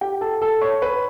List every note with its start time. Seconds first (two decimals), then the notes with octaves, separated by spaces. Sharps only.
0.01 G4 G5
0.21 A4 A5
0.42 A4 A5
0.61 C#5 C#6
0.82 B4 B5